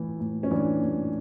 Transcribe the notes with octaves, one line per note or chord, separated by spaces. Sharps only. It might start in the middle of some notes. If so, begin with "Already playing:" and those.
Already playing: A2 E3
A2
C#4
E3 D4
A2